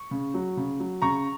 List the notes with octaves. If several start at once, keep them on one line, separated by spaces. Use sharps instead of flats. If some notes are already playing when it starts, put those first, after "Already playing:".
Already playing: C#6
C#3
F#3
C#3
F#3
C#3 A#5 C#6